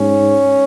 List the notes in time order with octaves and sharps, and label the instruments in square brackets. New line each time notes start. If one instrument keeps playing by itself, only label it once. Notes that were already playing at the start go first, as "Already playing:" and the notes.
Already playing: [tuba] G#2 [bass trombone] C#4